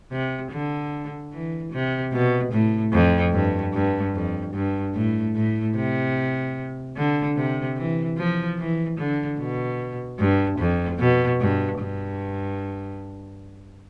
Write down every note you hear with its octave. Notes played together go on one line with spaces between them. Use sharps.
C3
D3
E3
C3
B2
A2
F2
G2
G2
F2
G2
A2
A2
C3
D3
C3
E3
F3
E3
D3
B2
G2
F2
B2
G2
G2